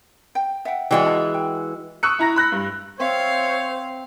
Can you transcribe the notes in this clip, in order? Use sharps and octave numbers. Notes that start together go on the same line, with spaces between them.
G5
E5 F#5 G5
E3 G#3 F#4 D5 D#5 G5
F4 A5
G5
C#6 D#6 E6 F#6 C#7
E4 A#5 A#6
B5 F#6 A#6
G2
C4 C5 C#5 E5 F5